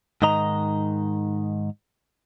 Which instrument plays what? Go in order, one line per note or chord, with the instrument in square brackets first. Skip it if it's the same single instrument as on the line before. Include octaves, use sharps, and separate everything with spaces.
[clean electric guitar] G#2 D#3 D#5 A#5